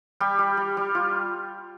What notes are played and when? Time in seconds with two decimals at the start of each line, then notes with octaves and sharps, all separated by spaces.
0.20 G3 G4
0.39 G3
0.57 G3
0.77 G3
0.95 F4